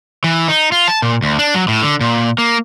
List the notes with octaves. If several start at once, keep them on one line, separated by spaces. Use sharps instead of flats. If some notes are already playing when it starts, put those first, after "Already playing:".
E3
D#4
F4
A5
A#2
D2
D4
F#3
A2
D3
A#2
A#3